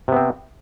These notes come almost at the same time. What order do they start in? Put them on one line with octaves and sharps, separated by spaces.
C3 B3 C4